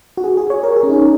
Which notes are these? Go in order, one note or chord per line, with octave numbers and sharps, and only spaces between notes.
F#4
G#4
G#4
C#5
A#4
G#4
C#4
D#4